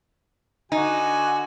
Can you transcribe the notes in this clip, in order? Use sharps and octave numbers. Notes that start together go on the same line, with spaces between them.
D3 D#4 F#4 G#5